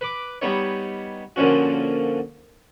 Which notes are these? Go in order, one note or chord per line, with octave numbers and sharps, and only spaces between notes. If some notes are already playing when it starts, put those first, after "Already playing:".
B4 D6
G3 B3 D#4 C#5
A#2 D3 F3 C#4 F#4